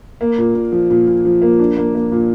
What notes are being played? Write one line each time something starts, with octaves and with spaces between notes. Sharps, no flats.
A#3
A#2
A#2
F3
A#2
A#2
F3
A#3
D4
A#3
A#3
A#2